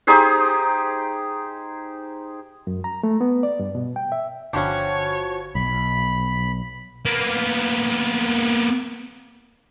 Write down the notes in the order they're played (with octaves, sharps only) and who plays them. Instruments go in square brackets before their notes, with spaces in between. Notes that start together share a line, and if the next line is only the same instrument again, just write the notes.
[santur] D#4 G4 G#4 C5
[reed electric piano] F#2
A#5
A3
B3
D5
G2
B2
G5
E5
[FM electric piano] G1 D3 B5 [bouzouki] F3 F#4 [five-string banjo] C#4 G4 [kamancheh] C#5
[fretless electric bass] B1 [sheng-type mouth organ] B5
[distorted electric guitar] A#3 B3